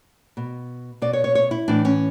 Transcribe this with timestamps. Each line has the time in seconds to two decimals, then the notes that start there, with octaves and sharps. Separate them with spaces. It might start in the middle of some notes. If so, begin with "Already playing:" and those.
0.37 B2
1.02 B2 D5
1.13 C#5
1.24 C#5
1.35 C#5
1.51 E4
1.68 A2 E3 D4
1.85 C#4